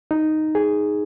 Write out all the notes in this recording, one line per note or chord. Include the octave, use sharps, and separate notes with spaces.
D#4
G#4